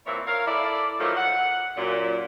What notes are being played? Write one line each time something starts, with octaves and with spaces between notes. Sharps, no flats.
A#2 E3 C4 E4 C#5
A#4 C#5 F5
E4 A4 D5
D#3 F3 F#3 A3
F#5
F#2 A#2